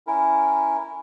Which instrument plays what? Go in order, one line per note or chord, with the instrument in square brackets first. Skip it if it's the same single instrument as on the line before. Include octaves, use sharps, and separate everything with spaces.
[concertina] C#4 E4 A#4